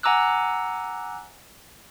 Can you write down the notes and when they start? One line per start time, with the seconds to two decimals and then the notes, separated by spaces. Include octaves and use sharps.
0.03 F#5 G#5 A#5 D6 E6 F#6